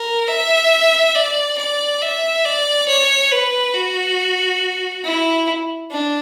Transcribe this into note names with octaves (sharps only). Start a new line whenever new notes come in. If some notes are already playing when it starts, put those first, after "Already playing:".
Already playing: A#4
E5
D5
D5
E5
D5
C#5
B4
F#4
E4
D4